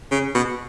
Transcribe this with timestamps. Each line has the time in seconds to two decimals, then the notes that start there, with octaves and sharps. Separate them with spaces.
0.12 C#3
0.35 B2